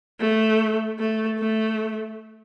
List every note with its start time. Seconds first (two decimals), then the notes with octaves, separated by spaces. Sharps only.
0.20 A3
0.99 A3
1.39 A3